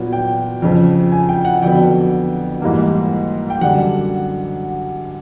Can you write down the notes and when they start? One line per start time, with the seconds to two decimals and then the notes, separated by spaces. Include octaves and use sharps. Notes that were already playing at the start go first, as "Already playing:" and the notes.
Already playing: A#2 F#3 B3
0.13 G5
0.62 F2 C#3 F3
1.12 G#5
1.29 G5
1.45 F#5
1.62 F2 D3 F#3 B3 G5
2.62 G#2 E3 G3 A#3
3.50 G5
3.61 F#2 D3 G3 F#5